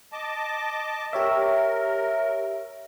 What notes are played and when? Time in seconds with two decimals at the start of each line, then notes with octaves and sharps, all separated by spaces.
0.12 D#5 A5 D6
1.13 G4 A#4 C#5 E5